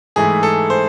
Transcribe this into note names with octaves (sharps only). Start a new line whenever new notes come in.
G#2 E3 A3 E4 G#4
A4
C5